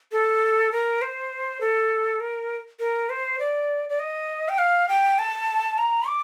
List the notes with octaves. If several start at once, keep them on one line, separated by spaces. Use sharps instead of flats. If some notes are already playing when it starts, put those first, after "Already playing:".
A4
A#4
C5
A4
A#4
A#4
C5
D5
D5
D#5
G5
F5
G5
A5
A#5
D6